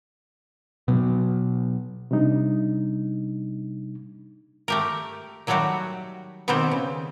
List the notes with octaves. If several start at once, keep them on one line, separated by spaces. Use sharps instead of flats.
B2 F#3 B3
C3 G3 D4 D#4
A3 G4 A#4
D#3 F#3 G3 A3 F#4 G4
B2 D#3 G3 B3 C4 C5
C#3